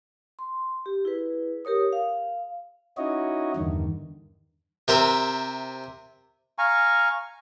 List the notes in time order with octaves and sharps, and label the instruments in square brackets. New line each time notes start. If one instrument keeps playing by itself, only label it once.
[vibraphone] C6
G4
E4 G#4 B4
G4 A#4 C#5 D#6
F5
[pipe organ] C#4 D#4 E4 F#4 C#5 D#5
E2 G2 D3 D#3
[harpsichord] C3 A#4 C5 E5
[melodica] F5 G#5 A#5 C#6